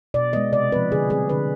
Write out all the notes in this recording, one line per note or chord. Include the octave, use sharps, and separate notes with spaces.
B2 D5
G#3 B3 D#5
C3 D5
F3 C4 B4
D3 G#4
G3 C4 G#4
D3 B4